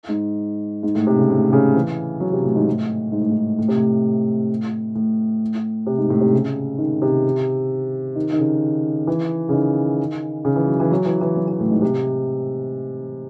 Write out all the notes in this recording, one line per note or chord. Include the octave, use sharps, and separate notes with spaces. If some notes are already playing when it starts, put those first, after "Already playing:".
G#2
G#2
A2
C3
C#3
A2
C#3
E3
F#3
C3
A2
G#2
A2
G#2
A2
G#2
A2
C3
A2
A2
C3
G#2
A2
C3
C#3
D#3
C3
D#3
D#3
C#3
E3
C#3
D#3
C#3
E3
F#3
E3
F#3
E3
E3
F#3
E3
A2
G#2
C3